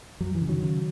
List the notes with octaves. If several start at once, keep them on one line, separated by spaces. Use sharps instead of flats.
F#2 F#3
E3
C#3
D#3 F#3
C#3